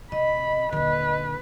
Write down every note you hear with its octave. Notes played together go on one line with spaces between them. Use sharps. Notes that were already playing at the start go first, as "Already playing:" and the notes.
C3 D#5 B5
D#1 D3 B4